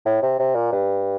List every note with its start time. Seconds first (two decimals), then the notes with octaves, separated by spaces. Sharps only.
0.06 A2
0.22 C3
0.39 C3
0.55 A#2
0.72 G2